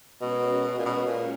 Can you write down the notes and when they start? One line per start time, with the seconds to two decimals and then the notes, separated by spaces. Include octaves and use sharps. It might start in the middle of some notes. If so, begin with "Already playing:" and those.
0.21 B2 G#3 C#4 F#4 A#4 C#5
0.78 A#2
0.85 B2
1.07 A#2